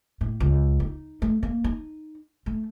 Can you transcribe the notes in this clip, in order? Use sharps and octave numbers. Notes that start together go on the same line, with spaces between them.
A2
C#2
D#4
A3
A#3
D#4
A3